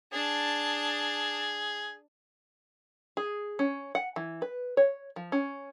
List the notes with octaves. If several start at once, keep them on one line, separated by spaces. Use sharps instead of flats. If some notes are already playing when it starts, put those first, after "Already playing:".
D4 G#4 A5
G#4
C#4
F#5
E3
B4
C#5
F3
C#4